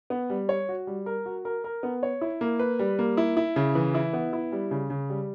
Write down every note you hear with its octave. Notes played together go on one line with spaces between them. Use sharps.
B3
G3
C#5
F#4
G3
A#4
F#4
A#4
A#4
B3
C#5
E4
A#3
B4
G3
A#3
E4
E4
C#3
E3
E4
B3
E4
G3
C#3
C#3
G3